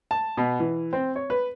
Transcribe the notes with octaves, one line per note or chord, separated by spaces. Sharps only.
A5
B2
E3
C4
C#5
B4